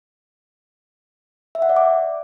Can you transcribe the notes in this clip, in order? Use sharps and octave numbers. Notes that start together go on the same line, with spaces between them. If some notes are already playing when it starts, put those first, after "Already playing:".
E5
F#5
D5
D6